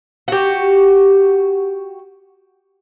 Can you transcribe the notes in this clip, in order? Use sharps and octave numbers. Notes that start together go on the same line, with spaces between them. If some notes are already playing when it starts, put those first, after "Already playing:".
F#4 G4